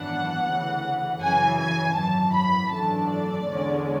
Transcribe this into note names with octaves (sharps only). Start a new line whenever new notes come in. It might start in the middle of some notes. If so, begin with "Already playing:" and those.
Already playing: G#1 F#2 E3 B3 D4 F#5
D2 C#3 E3
F#2 C#3 E3 G#5
G#5
G#1 F#2 E3 A5
B5
G#1 F#2 E3 A3 D4 A5
D5
E2 D3 G#3 C#4